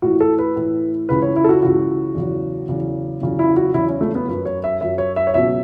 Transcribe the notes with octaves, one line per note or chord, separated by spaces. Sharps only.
A2 E3 F#4
A4
B4
A2 E3
C#2 C#3 E3 B4
C#5
E4
A4
F#4
C#2 C#3 E3 F#4
E2 C#3 F#3
E2 C#3 F#3
E2 C#3 F#3
E4
F#4
E2 C#3 F#3 E4
C#4
A3
B3
F#2 F#3 B4
C#5
E5
F#2 F#3 E5
C#5
E5
C#5
C#2 B2 F#3 E5